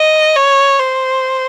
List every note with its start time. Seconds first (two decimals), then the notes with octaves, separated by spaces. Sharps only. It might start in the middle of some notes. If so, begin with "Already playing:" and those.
Already playing: D#5
0.36 C#5
0.79 C5